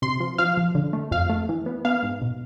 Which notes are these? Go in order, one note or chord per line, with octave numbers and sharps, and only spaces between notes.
C3 C6
F3
F3 F5
F3
D3
A3
F2 F5
A3
E3
B3
B3 F5
G#2
B2